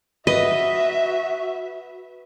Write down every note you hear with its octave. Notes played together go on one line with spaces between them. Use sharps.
F#4 B4 D#5 E5